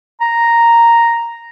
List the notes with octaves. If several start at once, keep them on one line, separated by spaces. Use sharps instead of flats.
A#5